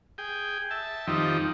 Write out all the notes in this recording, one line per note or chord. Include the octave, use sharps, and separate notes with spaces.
G#4 G5
E5 A5
F2 D#3 F3 G3 D#4